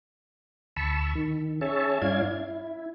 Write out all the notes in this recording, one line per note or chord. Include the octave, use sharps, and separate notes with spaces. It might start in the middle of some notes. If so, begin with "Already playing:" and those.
D2 A5 B5 C#6 E6
D#3
C#4 G#4 C#5 E5 A5
G2 C#4 E4 D5 F5 G#6
E4